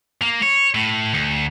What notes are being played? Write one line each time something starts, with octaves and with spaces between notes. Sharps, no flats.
A#3
C#5
A2
D2